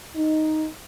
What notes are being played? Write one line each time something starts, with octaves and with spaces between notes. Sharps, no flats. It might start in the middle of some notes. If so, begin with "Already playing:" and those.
D#4